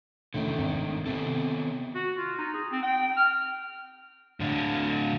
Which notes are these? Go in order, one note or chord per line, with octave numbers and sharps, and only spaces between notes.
F#2 A2 D3 D#3
G#1
C3 D#3 B3 A4
F#4
F4
D#4
G#4
C4
G5
F6
A2 D3